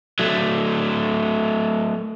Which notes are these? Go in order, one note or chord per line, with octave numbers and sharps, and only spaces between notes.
F#3 A3